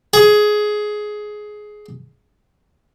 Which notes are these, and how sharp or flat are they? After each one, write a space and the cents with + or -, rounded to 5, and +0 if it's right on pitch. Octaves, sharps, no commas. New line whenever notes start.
G#4 +15